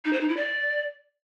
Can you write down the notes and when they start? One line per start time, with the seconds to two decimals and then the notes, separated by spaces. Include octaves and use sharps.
0.05 D#4
0.13 C5
0.21 D#4
0.29 E4
0.37 D5